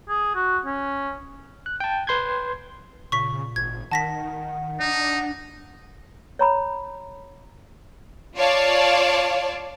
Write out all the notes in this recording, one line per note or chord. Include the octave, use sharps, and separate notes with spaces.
G#4
F#4
C#4
F#6
G5 A5
B4 C6 G6 G#6
A#2 C#3 C#6 B6
G#1 G#6
D#3 F#5 A5 A#6 B6
D4 D#4
C#5 A#5 B5
F4 C#5 D5 F5 A5